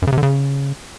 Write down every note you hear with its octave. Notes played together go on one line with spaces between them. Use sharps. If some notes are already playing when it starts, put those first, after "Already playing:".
F#2
C#3
C3
D3
C#3